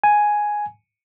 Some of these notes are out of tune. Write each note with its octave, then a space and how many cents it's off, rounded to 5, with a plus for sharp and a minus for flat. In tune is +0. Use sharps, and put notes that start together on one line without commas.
G#5 +5